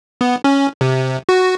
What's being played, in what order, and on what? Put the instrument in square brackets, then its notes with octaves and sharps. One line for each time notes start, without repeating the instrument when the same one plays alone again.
[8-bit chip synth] B3
C#4
C3
F#4